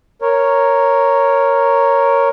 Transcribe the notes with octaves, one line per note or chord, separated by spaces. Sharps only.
A#4 C#5